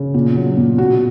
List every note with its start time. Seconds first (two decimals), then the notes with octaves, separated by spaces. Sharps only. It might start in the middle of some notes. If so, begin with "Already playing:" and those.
Already playing: C#3
0.14 A#2
0.35 F#3
0.57 A#2
0.78 B2 F#4